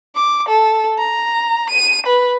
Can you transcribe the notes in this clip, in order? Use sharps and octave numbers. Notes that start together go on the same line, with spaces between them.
D6
A4
A#5
D#7
B4